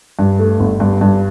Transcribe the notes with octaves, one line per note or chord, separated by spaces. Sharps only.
G2
A3
G1
G2
G2